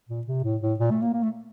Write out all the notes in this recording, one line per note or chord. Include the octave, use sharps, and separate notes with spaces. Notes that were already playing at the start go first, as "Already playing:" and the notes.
A#2
C3
A2
A2
A#2
A3
A#3
A#3
A3